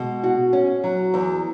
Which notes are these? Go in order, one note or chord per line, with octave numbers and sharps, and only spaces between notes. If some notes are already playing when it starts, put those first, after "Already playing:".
Already playing: B2 G#3
F#4
C#4
F#3
E2